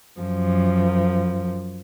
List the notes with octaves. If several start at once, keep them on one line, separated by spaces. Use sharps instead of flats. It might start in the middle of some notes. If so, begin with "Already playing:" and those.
F#2 F3